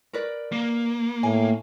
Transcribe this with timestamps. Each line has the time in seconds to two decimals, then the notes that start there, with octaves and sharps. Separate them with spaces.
0.13 A#4 B4 D5
0.52 A#3
1.23 A2 G#5